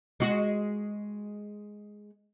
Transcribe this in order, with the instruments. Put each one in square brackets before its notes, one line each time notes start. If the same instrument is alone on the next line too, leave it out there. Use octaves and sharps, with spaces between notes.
[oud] G#3 F#4